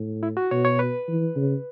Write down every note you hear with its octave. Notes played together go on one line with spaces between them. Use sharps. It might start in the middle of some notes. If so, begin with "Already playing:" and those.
Already playing: A2
E4
F#4
B2 C#5
C#5
B4
E3
C#3